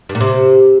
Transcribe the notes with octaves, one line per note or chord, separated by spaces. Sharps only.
G2
A#2
C3